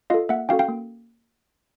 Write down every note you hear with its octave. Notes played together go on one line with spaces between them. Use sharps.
F4 A4 D#5 F5
A#3 E5 F#5
C#4 F#4 A4 F5 G5
F5 G5
A#3